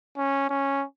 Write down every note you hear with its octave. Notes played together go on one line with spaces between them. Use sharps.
C#4
C#4